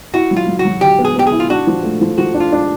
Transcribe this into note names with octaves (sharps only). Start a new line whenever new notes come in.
E4 F#4
F#3
F4
F#3
F#4
F#3
D3 G4
B3
G#4
B3 G4
G#4
E4
F4
D4 F#4
F3
A3
F3
F3 F#4
D4
F4
D4